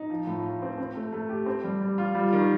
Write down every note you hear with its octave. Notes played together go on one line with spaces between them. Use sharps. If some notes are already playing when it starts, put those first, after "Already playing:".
Already playing: D#4
F3
A2
F4
C4
C4
A3
A3
G4
C4
G3
G3
F4
G3
D#3